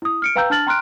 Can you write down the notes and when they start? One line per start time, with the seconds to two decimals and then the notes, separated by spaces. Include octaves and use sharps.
0.02 E4 D#6
0.22 F6 C#7 D7
0.36 B4 F5 G5 A#5 E6 G6
0.50 D4 A5 F6 A6 F#7
0.67 G5 A#5 C6 F6 F#6 D7